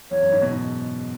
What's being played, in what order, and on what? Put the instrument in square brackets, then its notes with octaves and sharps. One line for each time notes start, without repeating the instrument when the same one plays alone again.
[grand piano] E2 [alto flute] C#5
[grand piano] F#2
G#2
B2
G#2